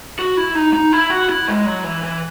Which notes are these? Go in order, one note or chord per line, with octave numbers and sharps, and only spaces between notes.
F#4
E4
D#4
D#4
E4
F#4
E4
G#3
F#3
E3
E3